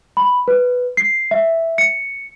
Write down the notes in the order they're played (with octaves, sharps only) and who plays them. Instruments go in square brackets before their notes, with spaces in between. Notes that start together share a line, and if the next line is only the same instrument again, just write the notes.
[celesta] B5
B4
C7
E5
C#7